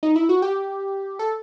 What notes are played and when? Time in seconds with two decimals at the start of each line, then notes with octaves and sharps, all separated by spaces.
0.03 D#4
0.16 E4
0.29 F#4
0.42 G4
1.19 A4